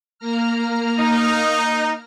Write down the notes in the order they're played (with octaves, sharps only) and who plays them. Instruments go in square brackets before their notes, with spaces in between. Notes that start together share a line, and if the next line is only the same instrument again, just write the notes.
[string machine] A#3 A#5 F6
[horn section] D#4